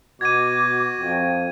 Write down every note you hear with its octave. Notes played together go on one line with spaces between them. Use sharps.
B2 F#4 D6 G#6 D#7
F2 G5